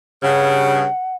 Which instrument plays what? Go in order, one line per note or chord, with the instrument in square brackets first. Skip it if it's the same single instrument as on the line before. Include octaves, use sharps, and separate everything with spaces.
[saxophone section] G2 C#3 [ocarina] F#5